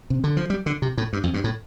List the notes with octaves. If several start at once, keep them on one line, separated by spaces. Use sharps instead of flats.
C3
D3
F3
G3
D3
C3
A2
G2
F2
G2
A2